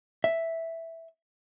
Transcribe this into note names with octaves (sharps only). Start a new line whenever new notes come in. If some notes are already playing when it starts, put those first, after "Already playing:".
E5